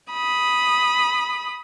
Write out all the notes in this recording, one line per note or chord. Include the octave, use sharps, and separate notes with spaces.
B5 D#6